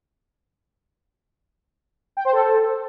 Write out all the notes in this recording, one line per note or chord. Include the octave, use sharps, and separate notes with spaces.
G5
C5
A4